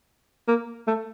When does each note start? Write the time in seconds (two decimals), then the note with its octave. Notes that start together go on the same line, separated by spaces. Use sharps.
0.48 A#3
0.88 A3